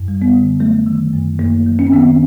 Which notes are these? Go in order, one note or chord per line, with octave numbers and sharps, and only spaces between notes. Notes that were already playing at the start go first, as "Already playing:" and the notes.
Already playing: F#2
G3
B3
D3
F#3 A3
D#3
F#2
F#2 A#3
F#3
C#4
C4
D#3 B3
C4